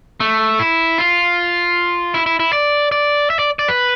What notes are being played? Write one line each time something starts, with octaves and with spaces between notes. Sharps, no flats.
A3
E4
F4
E4
E4
E4
D5
D5
E5
D5
D5
B4